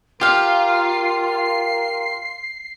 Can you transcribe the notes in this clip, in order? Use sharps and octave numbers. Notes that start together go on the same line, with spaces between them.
F4 G4 A#4 F5 C7